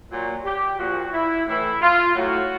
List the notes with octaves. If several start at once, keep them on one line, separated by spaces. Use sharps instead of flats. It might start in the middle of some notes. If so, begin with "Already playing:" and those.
A#2 F#3
G4
A#2 F3 F#4
E4
A2 E3 E4
F4
A2 F#3 F#4